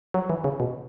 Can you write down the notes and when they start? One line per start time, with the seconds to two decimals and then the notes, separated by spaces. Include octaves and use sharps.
0.14 F#3
0.30 E3
0.44 C#3
0.60 B2